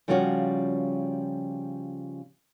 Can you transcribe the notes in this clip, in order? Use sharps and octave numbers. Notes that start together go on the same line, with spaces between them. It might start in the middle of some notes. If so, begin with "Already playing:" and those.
C#3 F3 G3 C#4 F4 F#4